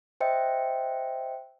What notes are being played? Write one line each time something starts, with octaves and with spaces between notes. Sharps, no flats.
C5 D#5 E5 G5 C#7